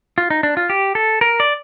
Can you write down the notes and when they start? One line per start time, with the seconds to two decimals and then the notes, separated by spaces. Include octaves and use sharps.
0.18 F4
0.30 D#4
0.43 D4
0.57 F4
0.70 G4
0.95 A4
1.21 A#4
1.40 D5